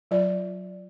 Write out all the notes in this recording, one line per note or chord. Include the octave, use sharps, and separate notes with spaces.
F#3 F4 D5